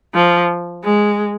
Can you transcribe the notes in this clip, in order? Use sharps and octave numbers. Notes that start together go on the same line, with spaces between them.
F3
G#3